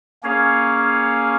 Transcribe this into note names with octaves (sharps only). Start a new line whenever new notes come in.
A#3 C#4 G#4 C#5 F5